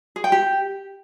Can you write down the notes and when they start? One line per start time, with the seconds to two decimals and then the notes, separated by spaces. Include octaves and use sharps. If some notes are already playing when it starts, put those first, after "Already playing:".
0.16 G#4
0.24 G5
0.32 G4